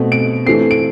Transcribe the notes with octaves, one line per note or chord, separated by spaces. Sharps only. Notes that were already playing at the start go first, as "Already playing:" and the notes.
Already playing: B2 A3 C4
D7
E3 A3 C4 C7
D7